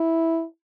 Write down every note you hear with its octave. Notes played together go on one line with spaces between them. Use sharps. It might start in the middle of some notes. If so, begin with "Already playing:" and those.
Already playing: E4